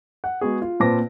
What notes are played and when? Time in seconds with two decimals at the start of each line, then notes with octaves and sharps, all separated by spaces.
0.24 F#5
0.41 G#3 B3 F#4 G#4
0.62 F4
0.80 A#2 C4 B4 A5 D6 A#6